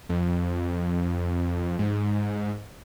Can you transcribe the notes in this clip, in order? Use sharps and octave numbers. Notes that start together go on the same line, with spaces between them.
F2
G#2